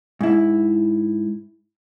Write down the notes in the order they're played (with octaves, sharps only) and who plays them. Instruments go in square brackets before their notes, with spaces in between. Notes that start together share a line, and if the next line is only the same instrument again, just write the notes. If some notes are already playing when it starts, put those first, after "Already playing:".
[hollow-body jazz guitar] G#2 E4